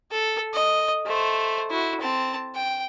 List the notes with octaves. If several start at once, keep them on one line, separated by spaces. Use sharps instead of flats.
A4
D#5
A3 C5
E4 F#4
C4 A5
G5